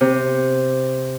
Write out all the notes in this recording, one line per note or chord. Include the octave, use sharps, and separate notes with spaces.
C3